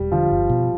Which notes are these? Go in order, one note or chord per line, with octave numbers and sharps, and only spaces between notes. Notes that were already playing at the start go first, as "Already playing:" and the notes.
Already playing: E1 G3
D3 F3
G1
B2